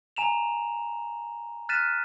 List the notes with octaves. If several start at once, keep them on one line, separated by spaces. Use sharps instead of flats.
G#5 A#5 E7 F7
F6 F#6 A6 B6 D#7 E7